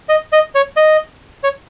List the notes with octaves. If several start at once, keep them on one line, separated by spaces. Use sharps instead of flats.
D#5
D#5
C#5
D#5
C#5